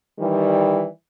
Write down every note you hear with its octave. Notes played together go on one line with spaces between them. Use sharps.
D#3 E3 G3